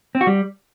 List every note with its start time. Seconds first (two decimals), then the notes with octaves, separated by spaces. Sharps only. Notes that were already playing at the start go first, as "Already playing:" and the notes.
0.15 C4
0.21 F#4
0.27 G3